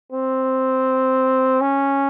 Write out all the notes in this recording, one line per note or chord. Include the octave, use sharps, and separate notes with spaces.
C4
C#4